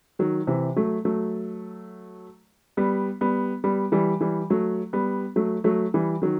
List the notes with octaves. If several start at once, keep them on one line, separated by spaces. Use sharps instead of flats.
D#3 F#3
C3 E3
F#3 A3
F#3 A3
G3 B3
G3 B3
G3 B3
E3 G3
E3 G3
F#3 A3
G3 B3
F#3 A3
F#3 A3
E3 G3
D#3 F#3